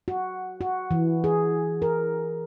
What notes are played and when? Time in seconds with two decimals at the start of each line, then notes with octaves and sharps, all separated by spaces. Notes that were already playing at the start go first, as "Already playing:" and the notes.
0.08 F#4
0.61 F#4
0.91 E3
1.24 G#4
1.82 A#4